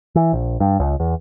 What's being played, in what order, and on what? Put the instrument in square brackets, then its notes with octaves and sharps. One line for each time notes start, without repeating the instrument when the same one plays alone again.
[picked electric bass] E3
A#1
G2
C#2
E2